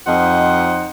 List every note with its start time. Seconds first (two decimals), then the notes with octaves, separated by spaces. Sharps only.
0.06 F2 D#4 C5 D#5 F#5